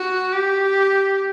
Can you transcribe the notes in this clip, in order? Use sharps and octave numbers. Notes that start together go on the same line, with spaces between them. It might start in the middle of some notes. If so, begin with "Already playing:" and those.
Already playing: F#4
G4